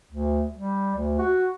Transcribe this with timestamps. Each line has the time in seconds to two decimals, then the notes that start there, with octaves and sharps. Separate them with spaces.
0.11 D2
0.56 G3
0.95 D2
1.18 F#4